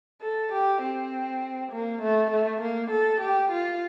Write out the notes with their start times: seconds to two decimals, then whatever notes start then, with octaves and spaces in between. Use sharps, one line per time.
0.21 A4
0.52 G4
0.82 C4
1.72 A#3
2.02 A3
2.31 A3
2.61 A#3
2.91 A4
3.20 G4
3.51 F4